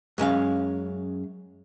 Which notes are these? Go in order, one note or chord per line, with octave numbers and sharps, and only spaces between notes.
F#2 G#3 C#4 F5